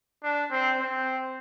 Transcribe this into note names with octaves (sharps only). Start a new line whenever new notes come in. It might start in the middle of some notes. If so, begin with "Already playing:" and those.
D4
C4
C4